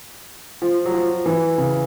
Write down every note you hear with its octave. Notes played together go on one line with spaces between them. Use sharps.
F3
F#3
F3
E3
C#3